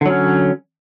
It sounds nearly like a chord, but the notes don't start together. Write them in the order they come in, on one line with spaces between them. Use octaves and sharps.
D3 F#3 C#4